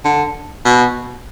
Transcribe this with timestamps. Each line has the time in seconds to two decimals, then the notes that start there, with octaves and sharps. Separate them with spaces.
0.04 D3
0.65 B2